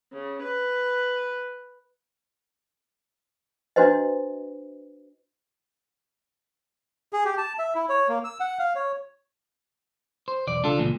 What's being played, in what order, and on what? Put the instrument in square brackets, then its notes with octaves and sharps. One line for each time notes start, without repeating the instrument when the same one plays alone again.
[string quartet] C#3
B4
[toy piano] D4 E4 F#4 B4 C5 D#5
[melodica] G#4
G4
A5
E5
E4
C#5
A#3
E6
F#5
F5
C#5
[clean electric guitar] C5
B1 E2 D5
C#2 D4 F4 A4
C#2 G2 A#2 E3